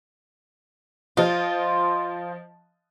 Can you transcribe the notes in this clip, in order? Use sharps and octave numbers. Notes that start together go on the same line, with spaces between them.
F3 F4 D#5